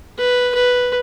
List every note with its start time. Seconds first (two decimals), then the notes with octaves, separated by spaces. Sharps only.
0.18 B4
0.55 B4